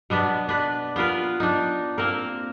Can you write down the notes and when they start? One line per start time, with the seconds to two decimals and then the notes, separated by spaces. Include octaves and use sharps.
0.10 B2 B3 D4 B4
0.49 D4 B4
0.96 B3 F4 A#4 B4
1.40 D4 D#4
1.98 A#3 C4 A#4